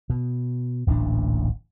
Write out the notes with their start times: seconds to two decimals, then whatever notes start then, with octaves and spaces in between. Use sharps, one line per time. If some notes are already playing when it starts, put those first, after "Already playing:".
0.10 B2
0.87 D1 A1 A#2 D4